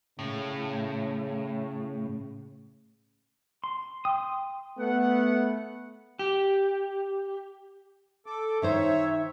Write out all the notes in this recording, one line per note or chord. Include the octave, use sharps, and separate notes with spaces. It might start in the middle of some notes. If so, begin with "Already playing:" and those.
A2 C#3
C6
G5 C6 D#6
A3 B3 F#5
G4
A4 D6
D#3 D#4 C5 C#5 E5